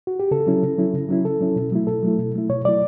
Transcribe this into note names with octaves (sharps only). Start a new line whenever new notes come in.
F#4
G4
C#3 A4
F#3 C#4 E4
C#3
F#3 C#4 E4
C#3
F#3 C#4 E4
C#3 A4
F#3 C#4 E4
B2
F#3 A3 E4
B2 A4
F#3 A3 E4
B2
F#3 A3 E4
B2 C#5
F#3 A3 E4 D5